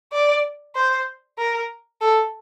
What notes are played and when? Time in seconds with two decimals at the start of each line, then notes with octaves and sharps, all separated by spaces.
0.13 D5
0.75 C5
1.38 A#4
2.01 A4